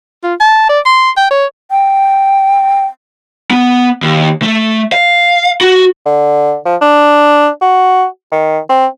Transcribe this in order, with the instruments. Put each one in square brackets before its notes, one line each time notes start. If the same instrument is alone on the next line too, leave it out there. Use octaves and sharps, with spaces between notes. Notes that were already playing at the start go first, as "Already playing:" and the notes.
[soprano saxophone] F4
A5
D5
C6
G5
C#5
[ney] G5
[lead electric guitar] B3
D#2
A3
F5
F#4
[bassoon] D3
F3
D4
F#4
D#3
C4